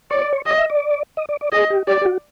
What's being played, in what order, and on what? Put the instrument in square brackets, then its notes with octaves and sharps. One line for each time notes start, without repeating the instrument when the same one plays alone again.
[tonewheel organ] C#5 [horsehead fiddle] D5
[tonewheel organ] D5
C#5
[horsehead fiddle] D#5
[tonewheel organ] E5
D5
D#5
D5
D5
[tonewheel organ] G#4 [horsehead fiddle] D#5
[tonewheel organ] G4
[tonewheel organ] G4 [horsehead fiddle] D5
[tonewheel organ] G4
F#4